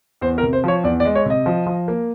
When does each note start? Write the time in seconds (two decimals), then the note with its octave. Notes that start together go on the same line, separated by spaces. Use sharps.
0.21 E2 C5
0.38 A#4
0.43 C3
0.53 C5
0.64 F3 C#5
0.84 E2 D5
1.00 D5
1.05 G#3
1.15 C#5
1.26 C3 D#5
1.46 F3
1.66 F3
1.88 A#3